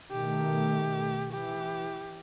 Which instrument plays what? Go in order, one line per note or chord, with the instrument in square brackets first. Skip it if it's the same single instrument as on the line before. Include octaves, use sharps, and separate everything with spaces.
[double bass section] B2 D#3 A3 [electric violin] G4
[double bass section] E3 [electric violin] G4